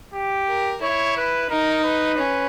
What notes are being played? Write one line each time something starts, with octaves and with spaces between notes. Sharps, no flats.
G4
A#4
E4 C#5
B4
D#4 A#4
B4
C#4